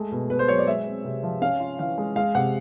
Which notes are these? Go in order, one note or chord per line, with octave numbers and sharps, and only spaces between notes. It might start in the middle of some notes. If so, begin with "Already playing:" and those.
Already playing: G#3 A3
B2
B2 B4
C5
F#3 C#5
D5
G#3 E5
C4
C3
F3
C#4 F5
F4
E3 F5
G#3
G#3 F5
C3 F#5